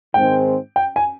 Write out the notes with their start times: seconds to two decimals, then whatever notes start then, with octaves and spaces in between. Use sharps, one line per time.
0.14 G#2 D#3 G#3 C4 G5
0.76 G5
0.96 G#5